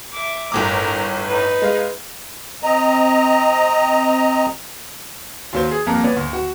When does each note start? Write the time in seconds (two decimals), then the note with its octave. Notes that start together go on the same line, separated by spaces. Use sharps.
0.12 E5 D6
0.52 G1 A2 A#4 D6
1.26 D#4 B4
1.62 G#3 F5
2.63 C4 D#5 A#5
5.53 D#2 F#3 C5
5.71 G#4
5.86 D#1 F2 A#3 F5 A#5
6.03 B3 C#4 D5
6.16 D2
6.33 F#4